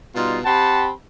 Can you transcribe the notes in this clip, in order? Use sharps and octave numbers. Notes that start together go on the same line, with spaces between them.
B2 G3 D#4 F4
C4 G4 F#5 A5 B5 C6